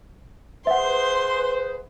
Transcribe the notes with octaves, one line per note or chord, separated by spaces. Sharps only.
G#4 B4 C5 E5 F#5 C6